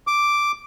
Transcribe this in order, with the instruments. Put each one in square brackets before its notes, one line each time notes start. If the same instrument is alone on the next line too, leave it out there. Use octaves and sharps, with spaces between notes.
[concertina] D6